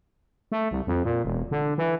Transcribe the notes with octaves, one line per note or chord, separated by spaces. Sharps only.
A3
C2
F2
A#2
E1
D3
E3